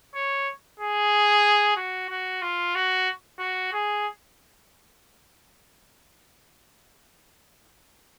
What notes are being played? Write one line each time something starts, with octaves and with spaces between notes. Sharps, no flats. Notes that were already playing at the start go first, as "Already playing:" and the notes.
C#5
G#4
F#4
F#4
F4
F#4
F#4
G#4